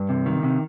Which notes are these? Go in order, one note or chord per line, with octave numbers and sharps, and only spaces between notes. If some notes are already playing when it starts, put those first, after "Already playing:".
Already playing: G2
C3
D#3
C3